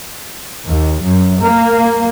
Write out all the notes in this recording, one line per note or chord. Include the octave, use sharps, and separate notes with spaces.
D#2
F#2
A#3